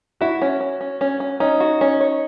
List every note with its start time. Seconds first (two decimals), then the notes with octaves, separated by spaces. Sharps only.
0.21 E4 F#4
0.42 C#4
0.61 C#4
0.81 C#4
1.01 C#4
1.20 C#4
1.40 C#4 D#4
1.60 F#4
1.81 C#4
2.01 C#5